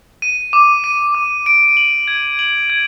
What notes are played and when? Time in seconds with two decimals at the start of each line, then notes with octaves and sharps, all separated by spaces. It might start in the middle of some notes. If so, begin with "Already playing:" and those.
0.22 D#7
0.53 D6
0.84 D#7
1.15 D6
1.46 D7
1.77 F#7
2.08 G#6
2.39 F#7
2.70 G#6